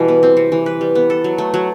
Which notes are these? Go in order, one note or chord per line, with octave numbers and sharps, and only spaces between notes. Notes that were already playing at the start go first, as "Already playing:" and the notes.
Already playing: B2 E3 G3
B3
C4
C3
E3
B4
G3
B3
A4
F#3
A3
F#3